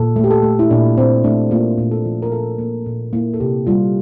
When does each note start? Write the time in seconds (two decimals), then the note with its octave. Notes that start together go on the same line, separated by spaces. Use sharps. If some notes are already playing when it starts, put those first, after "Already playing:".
Already playing: A#2 A4
0.16 A3
0.24 G4
0.31 A4
0.43 A3
0.59 E4
0.71 A#2 D4
0.98 A#2 C4
1.24 A3 D4
1.51 A#3 F4
1.78 A#2
1.91 A4
2.05 F3
2.22 A#4
2.32 A#2 A4
2.59 A#3
2.86 A#2 A4
3.13 A#3 E4
3.34 A4
3.40 C3 G4
3.67 G3 F4